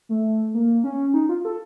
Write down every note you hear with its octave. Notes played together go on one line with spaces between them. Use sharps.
A3
A#3
C#4
D#4
F4
A4